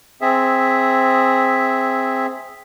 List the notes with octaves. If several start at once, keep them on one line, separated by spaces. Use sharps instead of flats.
C4 G#4 E5